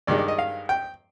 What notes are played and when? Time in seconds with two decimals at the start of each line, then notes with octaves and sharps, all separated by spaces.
0.07 G2 D#3 G#3 D5
0.18 D5
0.28 D#5
0.39 F5
0.69 G5